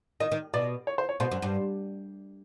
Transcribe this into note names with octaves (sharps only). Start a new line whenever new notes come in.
D#3 D#5
D#3
B2 D5
C#5
C5
C#5
B2 C5
F#2
G2